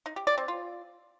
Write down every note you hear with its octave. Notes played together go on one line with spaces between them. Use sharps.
D#4
G4
D5
C4
F4